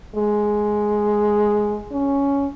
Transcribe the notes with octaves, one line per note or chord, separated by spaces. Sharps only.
G#3
C#4